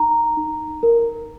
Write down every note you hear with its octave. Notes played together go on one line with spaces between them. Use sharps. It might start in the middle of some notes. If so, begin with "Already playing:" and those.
Already playing: D#4 A#5
D#4
A#4